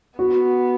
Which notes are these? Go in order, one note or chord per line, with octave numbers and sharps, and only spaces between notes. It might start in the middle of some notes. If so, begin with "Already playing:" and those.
B3 F#4